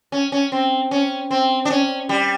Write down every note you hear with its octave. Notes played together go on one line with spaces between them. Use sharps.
C#4
C#4
C4
C#4
C4
D4
C#4
G3